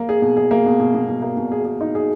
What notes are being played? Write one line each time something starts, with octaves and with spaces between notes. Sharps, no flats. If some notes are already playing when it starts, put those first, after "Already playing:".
Already playing: A#3
G#4
B2
G#4
A#3
B2
B2
B2
B2
A#3
B2
G#4
G#4
D#4
G#4